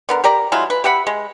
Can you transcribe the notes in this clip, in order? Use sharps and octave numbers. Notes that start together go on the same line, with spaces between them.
D3 B3 A#4
G4 A#4 D5 A#5
F#3 G#3 E4 F4
B4
G4 E5 F#5 B5
G#3